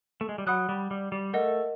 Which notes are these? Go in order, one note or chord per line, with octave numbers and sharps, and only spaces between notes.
A3
G#3
G3
F#3 F#5 B5 D#6 F#6
G3
G3
G3
A3 A#4 D#5 F#5